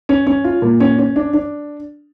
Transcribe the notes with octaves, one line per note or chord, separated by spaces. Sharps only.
C#4
C#4
F4
A#2
C#4
C#4
D4
D4